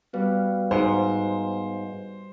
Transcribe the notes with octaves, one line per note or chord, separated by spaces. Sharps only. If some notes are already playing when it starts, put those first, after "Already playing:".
G3 B3 F#4 B4 F5
G#2 C5